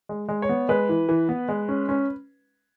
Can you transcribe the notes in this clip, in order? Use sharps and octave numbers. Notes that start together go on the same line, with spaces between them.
G#3
G#3
C#5
B3
G#3 B4
E3
E3
B3
G#3
C#4
C#4